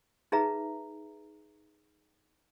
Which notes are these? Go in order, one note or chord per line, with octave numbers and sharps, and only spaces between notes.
D#4 G#4 B4 E5 A#5